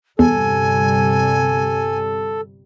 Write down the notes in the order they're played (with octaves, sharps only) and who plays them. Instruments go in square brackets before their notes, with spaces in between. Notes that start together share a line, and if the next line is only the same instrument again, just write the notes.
[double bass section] G1 C3 G3 [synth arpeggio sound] E2 [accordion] A4 [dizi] G#5